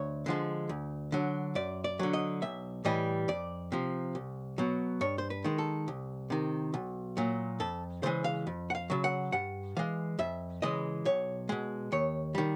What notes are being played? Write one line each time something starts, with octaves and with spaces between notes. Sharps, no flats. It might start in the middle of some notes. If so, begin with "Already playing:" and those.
Already playing: D2 C#5
D3 F3 G#3
D2
D3 F#3
F#2 D5
D5
D3 F#3
D#5
B1 E5
A2 E3 G3 D#5
F2 D5
C3 F3
C2
B2 F#3
G2 C#5
C5
B4
D#3 G#3
A4
C2
C3 D#3
B1
A#2 F#3
F2 A4
C#3 E3 G#3 C5
F5
F2
F#5
F5
C#3 F#3
F#5
G2 F#5
E3 G#3 F5
F2 E5
C#3 E3 G#3 D#5
B1 C#5
B2 G#3
D#2 C#5
D#3 G3